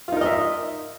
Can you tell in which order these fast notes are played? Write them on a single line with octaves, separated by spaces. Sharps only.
F4 D#4 A#4 D#5 E5